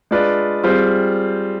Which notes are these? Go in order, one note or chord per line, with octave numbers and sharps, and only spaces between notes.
G#3 D4 F4 B4 D5
G3 C4 F4 G#4 C5